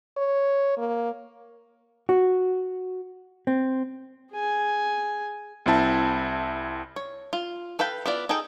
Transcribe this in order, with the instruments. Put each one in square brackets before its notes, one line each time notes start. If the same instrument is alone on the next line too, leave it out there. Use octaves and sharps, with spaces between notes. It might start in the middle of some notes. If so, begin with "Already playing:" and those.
[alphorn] C#5
A#3
[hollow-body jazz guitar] F#4
C4
[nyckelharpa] G#4 G#5
[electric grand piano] C2 C4 E4 A5
[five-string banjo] C#5
F4
A4 B4 F5 G5 B5
B3 E4 F4 D5
D#4 G#4 A4 D#5 G5